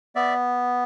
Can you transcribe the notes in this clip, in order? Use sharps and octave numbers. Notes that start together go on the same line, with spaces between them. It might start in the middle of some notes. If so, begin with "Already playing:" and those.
B3 D5 E5